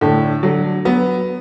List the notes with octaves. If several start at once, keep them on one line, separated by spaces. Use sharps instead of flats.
A2 D3
D3 F#3
F#3 B3